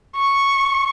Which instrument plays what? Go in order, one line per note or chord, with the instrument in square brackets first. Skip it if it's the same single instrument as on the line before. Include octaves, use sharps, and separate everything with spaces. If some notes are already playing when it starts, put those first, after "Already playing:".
[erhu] C#6